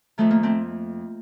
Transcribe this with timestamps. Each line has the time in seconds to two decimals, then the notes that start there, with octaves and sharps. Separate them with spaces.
0.18 F2 D#3 A3
0.31 A#3
0.43 A3 C4